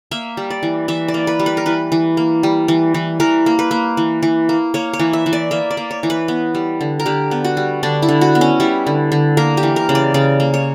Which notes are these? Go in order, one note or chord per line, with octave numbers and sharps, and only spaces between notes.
A#3 E5
G3
D5
E3
E3 E5
D5
A#3
B4
G3
B4
A#4
E3 B4
E3
A#3
G3
E3
E3
E3 A#4
A#3
B4
A#3
E3
E3
A#3
A#3 C#5
C#5
E3
E5
E3
D5
A#3 E5
D5
A#3
C#5
E3
B4
B3
G3
D3
A#4
D3 G4
B3
F#4
G3
D3 D4
E4
D3
F#4
B3
C#4
G3 E4
D3
D3
A#3 A#4
G4
E3
A#4
C#3
D5
C#3 D5
A#3
C#5